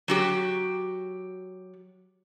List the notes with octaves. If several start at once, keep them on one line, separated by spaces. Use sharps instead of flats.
F#3 F#4 G4